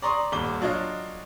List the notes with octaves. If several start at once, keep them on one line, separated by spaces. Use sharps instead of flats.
D5 A#5 C6 C#6 D#6
D#1 G2 D6 G7
F#3 D4 F4 C#5 D#5